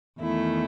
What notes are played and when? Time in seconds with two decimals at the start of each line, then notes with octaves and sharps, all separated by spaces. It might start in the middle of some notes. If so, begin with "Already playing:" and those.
0.21 E2 D#3 A3 E4